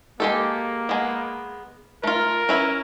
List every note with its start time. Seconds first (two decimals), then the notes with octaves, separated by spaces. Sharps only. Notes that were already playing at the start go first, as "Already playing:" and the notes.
0.20 G#3 A#3 G4 A4
0.89 G#3 B3
2.04 A3 F4 A#4
2.49 C#4 E4 B4